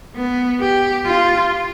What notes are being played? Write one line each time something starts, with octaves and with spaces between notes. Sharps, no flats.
B3
G4
F4